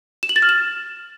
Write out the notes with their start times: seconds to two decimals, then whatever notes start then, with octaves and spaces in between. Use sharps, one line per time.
0.23 E7
0.29 F#7
0.36 A6
0.42 F6
0.49 E7